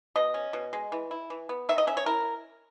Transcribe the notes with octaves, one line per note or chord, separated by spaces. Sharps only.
B2 D#5
C#4
B2
G#3
E3
E4
E3
B3
D#3 E5
D#5
C#4 E5
C#5
E4 A#4